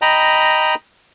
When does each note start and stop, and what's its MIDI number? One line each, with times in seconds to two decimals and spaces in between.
0.02 0.75 75
0.02 0.75 79
0.02 0.75 82
0.02 0.75 83